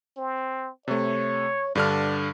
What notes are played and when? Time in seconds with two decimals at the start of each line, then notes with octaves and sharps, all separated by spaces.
0.17 C4
0.88 C3 A3 C#5
1.75 G2 D3 D4 F6